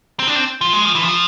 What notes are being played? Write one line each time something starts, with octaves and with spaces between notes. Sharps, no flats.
C4
D4
C4
F3
G#3
F3
E3
F3